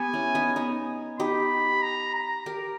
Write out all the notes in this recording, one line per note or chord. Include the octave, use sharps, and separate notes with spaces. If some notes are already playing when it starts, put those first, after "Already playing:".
Already playing: B3 G4 G#5
C#4 E4
B3 D#4
B3 D#4
D#4 G4 B5
A#5
A#5
G4 A#4